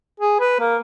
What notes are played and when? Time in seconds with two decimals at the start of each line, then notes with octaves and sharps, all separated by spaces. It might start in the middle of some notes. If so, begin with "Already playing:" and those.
0.20 G#4
0.40 B4
0.60 A#3